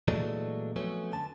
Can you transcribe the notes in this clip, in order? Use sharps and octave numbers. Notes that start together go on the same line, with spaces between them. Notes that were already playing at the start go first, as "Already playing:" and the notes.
A#2 E3 F#3 G#3 A3 D4
F2 F#3 A3 B3 C#4
D3 A5